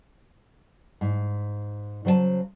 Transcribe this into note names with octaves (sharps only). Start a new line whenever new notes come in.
G#2
C#3 F#3 C5 C#5 A5